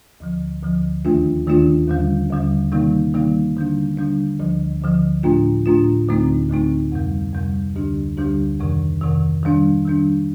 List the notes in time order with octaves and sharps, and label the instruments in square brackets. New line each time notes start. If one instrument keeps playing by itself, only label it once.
[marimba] D2 D3 F3
D2 D3 F3
D#2 D#3 A3 D4 F4
D#2 D#3 A3 D4 F4
D#2 D3 G3
D#2 D3 G3
C3 D#3 G3 A#3 D#4
C3 D#3 G3 A#3 D#4
D3 G3 D4
D3 G3 D4
D2 D3 F3
D2 D3 F3
A2 A3 D4 F4
A2 A3 D4 F4
D2 D3 A3 C4 D#4
D2 D3 A3 C4 D#4
F2 C3 G3
F2 C3 G3
D2 D3 G3 D4 G4
D2 D3 G3 D4 G4
F2 C3 D#3
F2 C3 D#3
D#3 G3 D4
D#3 G3 D4